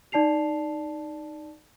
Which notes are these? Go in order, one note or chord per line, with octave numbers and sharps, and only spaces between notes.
D#4 D5 A5 C7 F7